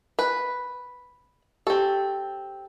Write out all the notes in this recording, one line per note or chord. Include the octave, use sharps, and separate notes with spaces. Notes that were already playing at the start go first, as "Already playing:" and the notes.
B4
C4 G4 A4